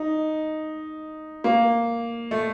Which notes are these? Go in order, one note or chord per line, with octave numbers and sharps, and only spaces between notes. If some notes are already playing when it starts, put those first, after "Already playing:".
Already playing: D#4
A#3
A3